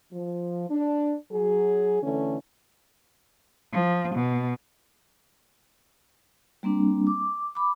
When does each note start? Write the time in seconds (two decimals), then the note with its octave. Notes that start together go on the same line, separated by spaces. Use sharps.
0.12 F3
0.69 D4
1.30 F#3 G#4
2.02 D3 E3 A3 C#4
3.73 F3
4.15 B2
6.63 G3 A#3 C4 D4
7.07 D6
7.55 B5 D6